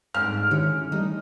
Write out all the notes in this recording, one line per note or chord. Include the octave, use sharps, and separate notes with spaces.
G#2 D3 F5 F6
D3 D#3 C#4 E4 G4
E3 G3 A3 D#4